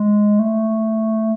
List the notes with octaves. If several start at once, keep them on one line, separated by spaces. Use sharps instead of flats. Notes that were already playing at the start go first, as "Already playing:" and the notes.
Already playing: G#3
A3